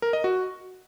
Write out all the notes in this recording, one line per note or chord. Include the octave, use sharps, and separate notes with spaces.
A#4
D#5
F#4